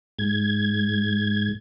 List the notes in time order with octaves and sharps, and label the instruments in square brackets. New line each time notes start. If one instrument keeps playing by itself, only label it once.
[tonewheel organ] G#2 G#6